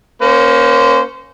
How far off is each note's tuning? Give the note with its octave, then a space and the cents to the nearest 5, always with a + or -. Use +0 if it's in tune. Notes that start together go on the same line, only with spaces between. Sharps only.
A#3 +20 C#4 +0 C5 -25